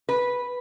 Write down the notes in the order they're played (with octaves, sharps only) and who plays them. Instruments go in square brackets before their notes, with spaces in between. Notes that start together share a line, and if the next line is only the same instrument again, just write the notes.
[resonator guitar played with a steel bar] B4